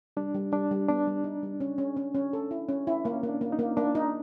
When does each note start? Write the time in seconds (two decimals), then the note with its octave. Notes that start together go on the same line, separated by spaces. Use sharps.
0.17 G3 D4
0.34 G3
0.52 G3 D4
0.71 G3
0.89 B3 D4
1.07 G3
1.24 D#4
1.43 G3
1.60 C#4
1.78 C#4
1.97 C#4
2.15 C#4
2.33 A4
2.51 E4
2.69 C#4
2.87 E4
3.04 A#3 C#4
3.23 A#3
3.29 D4
3.41 A#3
3.52 D#4
3.59 A#3
3.77 A#3 D4
3.95 D#4